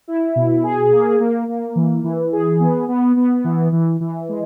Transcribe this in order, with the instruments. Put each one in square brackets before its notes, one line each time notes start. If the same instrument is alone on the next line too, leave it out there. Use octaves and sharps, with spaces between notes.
[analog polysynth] E4
B2
G#4
A#3
A#3
A#3
E3
E3
G#4
B3
B3
B3
E3
E3
E3
G#3